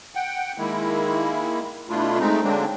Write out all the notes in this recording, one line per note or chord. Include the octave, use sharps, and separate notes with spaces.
F#5 G5
D#3 G#3 A#3 E4
B2 A3 D4 E4 F4
G#3 A3 C4 D#4
D3 F#3 G#3 A#3 C4 D4